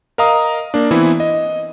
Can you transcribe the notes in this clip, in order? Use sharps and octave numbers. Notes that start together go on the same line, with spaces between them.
A#4 D#5 F5 A#5 D#6
A#3 D4
E3 B3 C4 E4
D#5